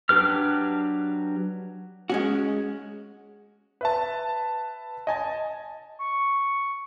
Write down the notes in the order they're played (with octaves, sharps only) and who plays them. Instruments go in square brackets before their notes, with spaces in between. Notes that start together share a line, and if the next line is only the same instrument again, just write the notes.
[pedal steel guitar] F#3 D4 G4 B4 F6
[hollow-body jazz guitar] G#3 C#4 F#4
[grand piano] B4 E5 A5
D#5 G#5 A5
[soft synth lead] C#6